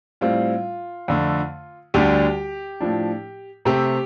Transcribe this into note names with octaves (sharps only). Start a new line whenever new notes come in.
A2 G3 C4 F4
F2 D3 A3
D2 D3 G3 D4 G4
A2 F3 D4
C3 A3 C4 G4